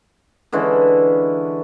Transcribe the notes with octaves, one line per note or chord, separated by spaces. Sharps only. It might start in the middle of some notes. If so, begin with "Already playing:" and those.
D3 E3 G#3 C#4